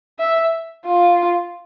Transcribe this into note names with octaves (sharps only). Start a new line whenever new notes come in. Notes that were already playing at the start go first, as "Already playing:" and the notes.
E5
F4